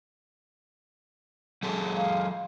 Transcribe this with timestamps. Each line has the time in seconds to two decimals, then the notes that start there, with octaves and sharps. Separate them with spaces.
1.63 F#3 G#4 A4
1.96 F5